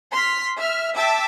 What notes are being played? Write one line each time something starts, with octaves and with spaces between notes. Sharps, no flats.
C6 F6 B6
E5 F6
E5 G5 A5 D6 E6